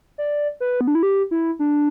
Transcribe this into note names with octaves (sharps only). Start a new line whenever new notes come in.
D5
B4
B3
D4
E4
G4
E4
D4